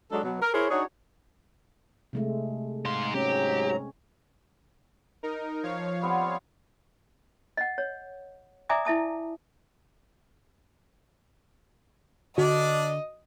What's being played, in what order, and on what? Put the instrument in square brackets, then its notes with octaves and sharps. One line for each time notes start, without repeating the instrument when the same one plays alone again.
[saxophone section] F#3 G#3 D4 D#4 F#4 A4
B2 F#3
A#4
E4 G#4 A#4 C5 C#5
D4 D#4 F#4 G#4 C#5
[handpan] C3 G#3 A3
[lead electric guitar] G#2 C6 [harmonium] F5
[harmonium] G#2 F#3 A#5 [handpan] G#3 C4 C#4 [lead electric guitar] G4
[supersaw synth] D#4 A#4
F3 C#5 F5
[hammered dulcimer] G3 B3 C4
[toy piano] D#5 F#5
C#5
D5 E5 G#5 A#5 D6 D#6
E4 E5 A5 D#6
[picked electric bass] D3 [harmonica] D4 D5 [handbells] F#4 [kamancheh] D#5